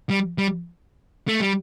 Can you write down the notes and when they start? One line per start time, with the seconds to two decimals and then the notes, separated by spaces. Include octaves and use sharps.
0.10 G3
0.38 G3
1.28 A3
1.40 G3